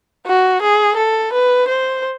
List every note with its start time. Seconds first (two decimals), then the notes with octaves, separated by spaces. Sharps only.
0.26 F#4
0.62 G#4
0.96 A4
1.33 B4
1.68 C5